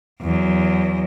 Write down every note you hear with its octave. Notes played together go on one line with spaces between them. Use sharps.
E2 F#3